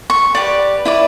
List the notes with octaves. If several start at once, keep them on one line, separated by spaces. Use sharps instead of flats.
C#6
G4 B4 D5
E4 B4 D5